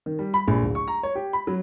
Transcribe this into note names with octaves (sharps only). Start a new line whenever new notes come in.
D#3
G3
B5
A#1
D1
C#6
A#5
C#5
G4
B5
F#3